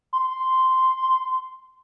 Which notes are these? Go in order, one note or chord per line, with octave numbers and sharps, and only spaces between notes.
C6